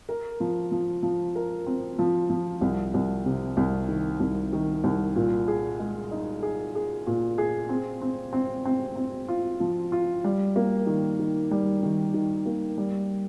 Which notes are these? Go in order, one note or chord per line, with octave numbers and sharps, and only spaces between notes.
A#4
F3
F3
F3
A#4
C4
F3
F3
C2
C2
C3
C2
D#3
C2
D#3
C2
A#2
G#4
G#3
D#4
G#4
G#4
A#2
G#4
C4
C4
C4
C4
C4
F4
F3
F4
G3
A#3
D#3
D#3
G3
D#3
D#3
A#3
G3